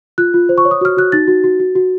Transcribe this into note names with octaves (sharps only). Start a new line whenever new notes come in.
F4 F#6
F4
C5
C#6
C#5
D#6
F#4 F6
F#4 F#6
D#4 A6
F#4
F#4
F#4
F#4